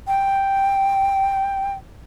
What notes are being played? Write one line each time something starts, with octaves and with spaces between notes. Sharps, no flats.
G5